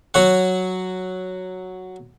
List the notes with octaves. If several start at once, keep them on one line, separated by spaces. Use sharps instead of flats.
F#3 F#4 C#5 F#5